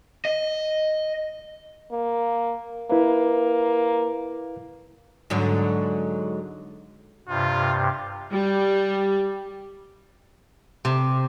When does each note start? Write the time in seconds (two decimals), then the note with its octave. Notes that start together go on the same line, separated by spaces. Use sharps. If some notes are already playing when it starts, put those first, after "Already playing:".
0.25 D#5
1.92 A#3
2.91 A#3 E4 B4
5.30 G#2 D3 F#3
7.28 G2 C3 F4
8.32 G3
10.85 C3